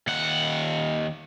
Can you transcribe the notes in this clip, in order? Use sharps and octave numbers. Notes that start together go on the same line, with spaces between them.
D#2 F#5